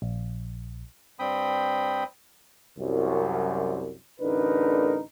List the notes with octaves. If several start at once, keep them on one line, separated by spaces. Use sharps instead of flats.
A#1
G2 C4 G5 B5 D#6
C2 F#2
A1 D2 D4 D#4 A#4 B4